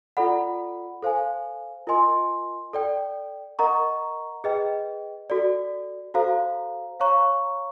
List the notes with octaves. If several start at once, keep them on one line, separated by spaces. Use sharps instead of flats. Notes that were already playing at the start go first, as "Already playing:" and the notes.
F4 A4 D5 F#5 B5
A4 C5 F5 G#5
F4 A#4 D#5 G#5 C6
A4 D5 G5
A#4 D#5 F#5 A#5 C#6
G#4 B4 D#5 G5
F#4 A4 D5
F#4 A4 C5 F5 A#5
C#5 F5 A#5 C#6